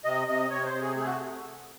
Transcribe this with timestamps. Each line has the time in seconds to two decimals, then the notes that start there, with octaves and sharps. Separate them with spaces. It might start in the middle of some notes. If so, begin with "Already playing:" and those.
0.05 C3 D#5
0.27 C3 D#5
0.50 C3 C#5
0.65 C5
0.73 C3
0.80 G#4
0.96 A3 G#4
1.06 F#4
1.19 C3